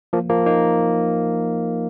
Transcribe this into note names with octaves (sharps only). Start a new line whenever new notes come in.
F3 A#3
F3 A#3
A#3 D#4